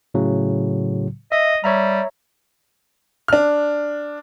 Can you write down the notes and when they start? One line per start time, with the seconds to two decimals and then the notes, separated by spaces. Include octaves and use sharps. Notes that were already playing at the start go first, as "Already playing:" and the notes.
0.14 A2 C#3 F#3
1.32 D#5 E5
1.64 G3 C#5 E5 A#5
3.28 D4 F6